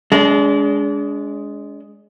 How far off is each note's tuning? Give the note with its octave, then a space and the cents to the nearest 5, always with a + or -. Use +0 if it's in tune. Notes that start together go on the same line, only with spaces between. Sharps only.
G#3 +0 D4 -40